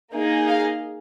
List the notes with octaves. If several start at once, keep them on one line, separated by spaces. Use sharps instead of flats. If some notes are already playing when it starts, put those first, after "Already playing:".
A#3 D#4 G#4
F5